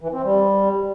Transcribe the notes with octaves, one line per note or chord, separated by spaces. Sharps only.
E3
C4
G3